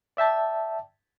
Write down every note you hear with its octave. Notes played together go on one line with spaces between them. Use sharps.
D5 E5 G5 A5